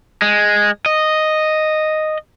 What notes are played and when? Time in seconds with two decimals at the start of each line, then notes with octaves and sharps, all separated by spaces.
0.22 G#3
0.86 D#5